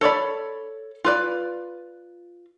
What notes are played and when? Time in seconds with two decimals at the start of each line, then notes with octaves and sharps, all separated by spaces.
0.01 A4 C#5 D5 B5
1.04 F4 B4 D5